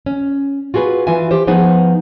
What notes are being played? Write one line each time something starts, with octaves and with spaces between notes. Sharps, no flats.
C#4
F4 F#4 G#4 A4 B4
E3 F4 E5 G#5
G4 C5
F3 B3 D#4 G#4 B4 C5